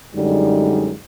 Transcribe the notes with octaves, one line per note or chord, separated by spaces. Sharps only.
F#2 D3 G3 G#3 D#4